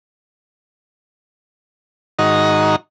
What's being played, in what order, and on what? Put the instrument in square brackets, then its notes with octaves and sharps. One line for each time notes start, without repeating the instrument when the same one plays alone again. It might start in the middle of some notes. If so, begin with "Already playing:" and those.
[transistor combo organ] G#2 D#3 D#4 F#4 A#5